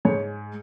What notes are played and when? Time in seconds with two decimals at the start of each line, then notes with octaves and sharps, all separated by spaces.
0.05 G#2 C#5